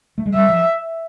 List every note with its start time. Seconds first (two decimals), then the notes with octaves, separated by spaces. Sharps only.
0.18 A3
0.26 G#3
0.34 G3 E5
0.49 F3